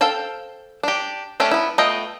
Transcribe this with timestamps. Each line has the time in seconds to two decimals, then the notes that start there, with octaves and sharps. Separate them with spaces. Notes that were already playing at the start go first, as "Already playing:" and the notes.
0.01 A4 C5 F5 G5 A5
0.83 D4 G4
1.40 A3 C#4 D4 G4
1.51 B3 E4
1.78 A3 B3 F4 D#5 G5